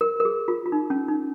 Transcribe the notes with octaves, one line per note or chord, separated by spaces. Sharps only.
A#4
A#4
G#4
F4
F4
D#4
C#4
D#4